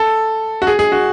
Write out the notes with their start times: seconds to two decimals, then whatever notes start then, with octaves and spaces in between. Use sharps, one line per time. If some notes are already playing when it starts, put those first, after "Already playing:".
Already playing: A4
0.62 F#4
0.67 G#4
0.79 G#4
0.92 F#4